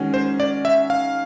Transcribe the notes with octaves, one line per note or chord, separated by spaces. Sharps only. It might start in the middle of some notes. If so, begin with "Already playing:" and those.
Already playing: D#3 G#3 C#4 F#4
C5
D5
E5
F5